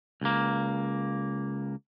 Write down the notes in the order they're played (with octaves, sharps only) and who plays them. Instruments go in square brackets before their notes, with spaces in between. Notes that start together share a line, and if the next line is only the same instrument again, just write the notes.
[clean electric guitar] C#2 A#3